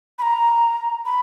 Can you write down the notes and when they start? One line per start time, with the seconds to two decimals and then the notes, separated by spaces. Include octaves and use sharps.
0.19 B5
0.22 A#5
1.05 B5